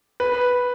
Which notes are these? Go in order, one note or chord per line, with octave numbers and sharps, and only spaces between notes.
B4